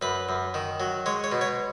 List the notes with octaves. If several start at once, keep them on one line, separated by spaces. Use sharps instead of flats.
F#2 B4
F#2
D#3
F#3
G#3 C#5
C#5
B2
C#5